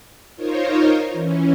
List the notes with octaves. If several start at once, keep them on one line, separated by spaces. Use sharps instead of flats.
D#4 F4 A#4 C5 C#5
E3 C#4